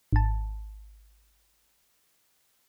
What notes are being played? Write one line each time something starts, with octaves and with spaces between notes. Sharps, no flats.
G#1 A5